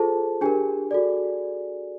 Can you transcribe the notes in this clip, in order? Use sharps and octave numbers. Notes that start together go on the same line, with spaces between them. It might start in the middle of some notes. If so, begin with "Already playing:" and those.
Already playing: F4 G#4 A4 C5 A5
D4 G4 G#4 A#4 G#5
F#4 A4 D5